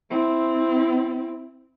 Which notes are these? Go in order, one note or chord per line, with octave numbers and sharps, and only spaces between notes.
C4 E4